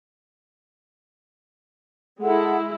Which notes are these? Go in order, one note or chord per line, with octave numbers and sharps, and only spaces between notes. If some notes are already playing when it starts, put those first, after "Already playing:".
G#3 E4 A4 F#5